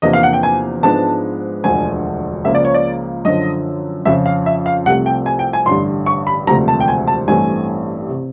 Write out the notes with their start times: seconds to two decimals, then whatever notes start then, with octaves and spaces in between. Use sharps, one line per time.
0.02 E2 C3 F3 A#3 D4 D#5
0.13 F5
0.23 F#5
0.33 G5
0.43 G#5
0.83 G#2 F3 G#3 B3 D4 A5
1.64 E1 D2 D3 F3 G#5
2.44 C#2 C#3 F3 A#3 E5
2.55 D5
2.65 C#5
2.74 D5
3.25 F#2 D3 F3 D#5
4.05 F2 C#3 F3 E5
4.26 F5
4.46 E5
4.66 F5
4.86 C2 C3 F3 A3 F#5
5.06 G5
5.26 G#5
5.39 G5
5.53 G#5
5.66 A1 G2 D3 C6
6.06 C#6
6.27 B5
6.47 E1 D2 C3 F3 A3 A#5
6.68 A5
6.80 G5
6.88 G#5
7.07 A5
7.28 A1 G2 E3 A3 C4 G#5
8.08 C3